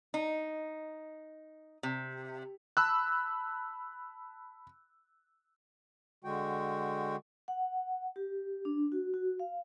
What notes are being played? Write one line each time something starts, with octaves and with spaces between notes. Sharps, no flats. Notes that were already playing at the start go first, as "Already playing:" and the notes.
D#4
C3
A5 B5 E6 F#6
D3 G#3 F#4 G5
F#5
G4
D4
F#4
F#4
F5